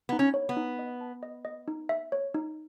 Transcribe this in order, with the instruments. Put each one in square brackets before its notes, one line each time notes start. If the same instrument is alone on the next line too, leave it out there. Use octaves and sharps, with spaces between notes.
[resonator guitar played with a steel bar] B3 [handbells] D#4
[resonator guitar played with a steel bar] C#4
[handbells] C#5
[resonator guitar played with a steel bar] B3
[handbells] D#4
D#5
A5
D#5
D#5
D#4
E5
C#5
D#4